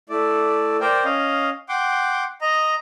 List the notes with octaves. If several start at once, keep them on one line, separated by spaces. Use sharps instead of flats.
A3 E4 D5
A#4 C5 D5 G5
C#4 D#5 F5
F#5 G5 C6 D6
D#5 A#5